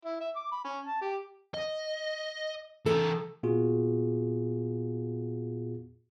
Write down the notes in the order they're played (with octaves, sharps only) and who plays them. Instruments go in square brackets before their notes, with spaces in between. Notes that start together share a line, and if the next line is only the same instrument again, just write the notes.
[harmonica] E4
E5
D6
B5
C#4
A5
G4
[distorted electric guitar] D#5
[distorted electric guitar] E3 A#4 [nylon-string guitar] A4
[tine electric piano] A#2 B3 F4 F#4 G#4